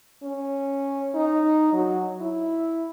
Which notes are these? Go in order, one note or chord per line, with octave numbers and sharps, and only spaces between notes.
C#4
D#4
F#3
E4